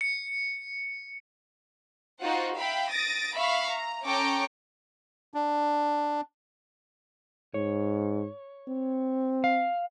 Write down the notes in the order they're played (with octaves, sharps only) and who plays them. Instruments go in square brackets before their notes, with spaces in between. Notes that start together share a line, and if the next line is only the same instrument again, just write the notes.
[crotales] C#7
[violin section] D#4 F4 F#4 C5 F#5
E5 F5 G5 B5
D#6 A6 A#6 D7
E5 F5 B5 C#6
A#5
C#4 A4 G5 A#5 C#6 D6
[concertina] D4
[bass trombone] G#2 [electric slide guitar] C#5
[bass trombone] C4
[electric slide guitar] F5